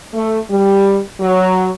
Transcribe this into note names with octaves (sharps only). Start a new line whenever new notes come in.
A3
G3
F#3